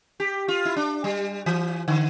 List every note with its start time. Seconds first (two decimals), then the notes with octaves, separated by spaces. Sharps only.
0.20 G4
0.48 F4
0.65 E4
0.76 D4
1.04 G3
1.46 E3
1.88 D3